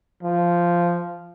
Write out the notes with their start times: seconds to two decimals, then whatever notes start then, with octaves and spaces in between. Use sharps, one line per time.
0.23 F3